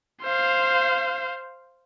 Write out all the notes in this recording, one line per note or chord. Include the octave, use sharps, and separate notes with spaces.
C5 F5